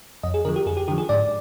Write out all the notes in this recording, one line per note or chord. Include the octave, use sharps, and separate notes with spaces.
F2 D#5
G#4
D3 F3 A#4
G4
F2 G#4
G4
D3 F3 G4
G#4
G#2 D5